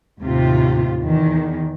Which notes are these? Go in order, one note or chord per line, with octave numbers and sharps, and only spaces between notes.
D#2 A2 C3 F4
E2 D#3